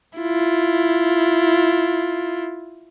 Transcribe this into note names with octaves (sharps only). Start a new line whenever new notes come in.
E4 F4